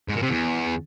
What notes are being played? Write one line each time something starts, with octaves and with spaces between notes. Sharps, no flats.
G#2
A#2
C3
E2